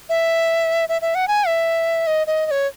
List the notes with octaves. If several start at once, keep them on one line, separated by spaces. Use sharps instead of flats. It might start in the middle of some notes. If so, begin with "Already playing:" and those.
E5
E5
E5
F#5
G#5
E5
D#5
D#5
D#5
C#5